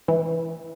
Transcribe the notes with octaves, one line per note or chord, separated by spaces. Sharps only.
E3